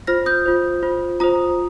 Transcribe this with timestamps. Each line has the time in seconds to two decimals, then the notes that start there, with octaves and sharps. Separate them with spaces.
0.07 F4 C5 F6 A#6
0.26 D#6 G6
0.46 F4 C5
0.83 F4 C5
1.20 F4 C5 A#5 D#6